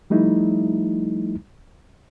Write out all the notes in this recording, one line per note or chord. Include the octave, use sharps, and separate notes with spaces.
F3 G3 A3 D#4 E4